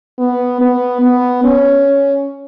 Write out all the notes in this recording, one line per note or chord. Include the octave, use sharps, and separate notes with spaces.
B3
B3
B3
C#4